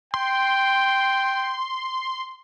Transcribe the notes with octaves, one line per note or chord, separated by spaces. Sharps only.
G5 C6